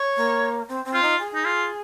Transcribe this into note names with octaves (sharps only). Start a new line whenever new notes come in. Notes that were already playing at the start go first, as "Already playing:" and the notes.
Already playing: C#5
A#3
C4
C4
F4
D#4
G#4
D#4
F4